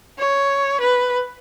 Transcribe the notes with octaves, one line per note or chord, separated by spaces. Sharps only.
C#5
B4